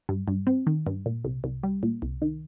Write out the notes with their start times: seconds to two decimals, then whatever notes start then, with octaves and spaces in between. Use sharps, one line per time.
0.09 G2
0.28 G2
0.47 C4
0.67 D#3
0.87 G2
1.06 A#2
1.24 C2
1.44 C2
1.63 G3
1.83 A#2
2.02 C2
2.22 D#3